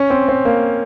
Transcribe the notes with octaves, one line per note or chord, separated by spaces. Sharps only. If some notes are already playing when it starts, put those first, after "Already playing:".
Already playing: C#4
C4
C4
A#3